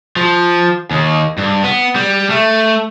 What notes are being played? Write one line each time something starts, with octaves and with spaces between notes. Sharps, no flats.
F3
D#2
G2
B3
G3
A3